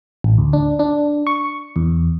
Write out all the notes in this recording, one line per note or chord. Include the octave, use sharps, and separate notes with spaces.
A1
D2
D4
D4
C#6
E2